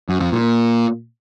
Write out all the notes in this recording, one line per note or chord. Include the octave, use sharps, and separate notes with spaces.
F#2
F2
A#2